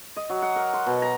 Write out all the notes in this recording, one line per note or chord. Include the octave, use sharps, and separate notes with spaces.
D#5
F#3
F#5
A#4
C6
B2
A#5